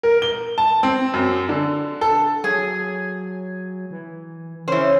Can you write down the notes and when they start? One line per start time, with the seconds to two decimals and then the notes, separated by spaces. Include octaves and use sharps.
0.03 A#4
0.22 G7
0.58 A5
0.83 C4
1.14 F#2
1.49 D3
2.01 A4
2.44 F#3 G#4 G#5
3.91 E3
4.68 C#3 E3 C#4 C5